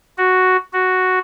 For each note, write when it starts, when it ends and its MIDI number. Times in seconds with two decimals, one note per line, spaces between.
0.18 0.57 66
0.73 1.19 66